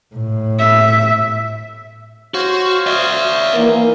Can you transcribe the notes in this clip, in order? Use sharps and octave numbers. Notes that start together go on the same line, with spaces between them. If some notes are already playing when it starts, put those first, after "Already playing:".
A2
E5
F#4 C5 C#5 F5
D5 E5
D#3 E3 A#3 F5